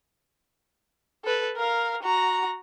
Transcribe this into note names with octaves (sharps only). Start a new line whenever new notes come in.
A4 B4
A#4 F5
F#4 A#5